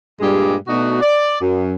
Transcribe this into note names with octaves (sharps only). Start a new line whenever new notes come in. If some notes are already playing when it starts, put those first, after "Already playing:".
G2 A#2 G3 G#3 G4 G#4
B2 A3 D4 D#4 F#4
D5
F#2